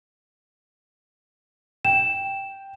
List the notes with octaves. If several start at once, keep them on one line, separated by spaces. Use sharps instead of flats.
G5 E7